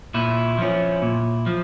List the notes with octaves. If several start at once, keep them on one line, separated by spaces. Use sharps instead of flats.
A#2 E4
F3 C#4
A#2
F3